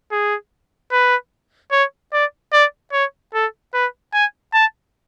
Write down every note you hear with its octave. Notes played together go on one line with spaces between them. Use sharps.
G#4
B4
C#5
D5
D5
C#5
A4
B4
G#5
A5